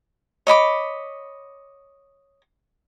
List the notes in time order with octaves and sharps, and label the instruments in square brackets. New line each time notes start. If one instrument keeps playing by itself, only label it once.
[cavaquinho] C#5 D#5 B5 D6